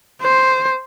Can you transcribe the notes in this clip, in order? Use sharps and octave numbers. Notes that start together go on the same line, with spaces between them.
C5